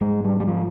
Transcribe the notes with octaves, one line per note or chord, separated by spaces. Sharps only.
G#2 G#3
G3
G3
F3